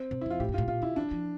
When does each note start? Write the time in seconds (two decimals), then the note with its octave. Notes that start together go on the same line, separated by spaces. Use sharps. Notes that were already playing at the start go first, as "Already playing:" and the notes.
Already playing: C4
0.11 C3
0.21 E4
0.26 F2 F4
0.40 A2 G4
0.49 G2
0.54 A2 F4
0.68 A#2 F4
0.82 D3 E4
0.96 E3 D4
1.11 F3